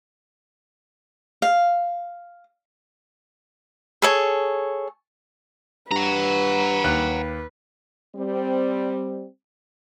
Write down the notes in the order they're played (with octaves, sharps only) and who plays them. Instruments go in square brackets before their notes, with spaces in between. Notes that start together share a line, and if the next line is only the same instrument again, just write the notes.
[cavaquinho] F5
G#4 A4 C#5
[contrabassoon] G2 [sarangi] B4 [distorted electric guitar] F#5 A#5
[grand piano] D#2 F#6
[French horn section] G3 C4